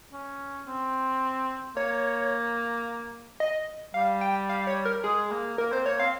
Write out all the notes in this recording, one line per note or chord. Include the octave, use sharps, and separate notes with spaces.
C#4
C4
A#3 C#5
D#5
G3 F5
G5
F5
C#5
A#4
G#3 G#4
A#3
A#3 A#4
C4 C5
A#3 C#5
C4 F5